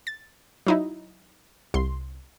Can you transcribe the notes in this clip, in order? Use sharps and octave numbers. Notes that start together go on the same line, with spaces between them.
A6
F#3 D#4 E4
C2 C6